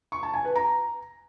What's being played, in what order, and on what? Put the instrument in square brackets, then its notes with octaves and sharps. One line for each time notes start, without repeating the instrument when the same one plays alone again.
[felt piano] C#6
A5
G#5
B4
A#5